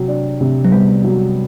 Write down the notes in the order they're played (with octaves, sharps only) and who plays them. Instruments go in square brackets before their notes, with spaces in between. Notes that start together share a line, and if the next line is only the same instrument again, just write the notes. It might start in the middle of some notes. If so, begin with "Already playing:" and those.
Already playing: [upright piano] C3 F#3
D4
C3
[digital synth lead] F#3
[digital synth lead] G3 [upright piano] B3
[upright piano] F#3